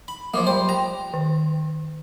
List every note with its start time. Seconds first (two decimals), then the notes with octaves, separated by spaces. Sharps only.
0.08 B5
0.34 F3 F#3 A#3 D6
0.47 G3 C5
0.69 G5 A#5
1.14 D#3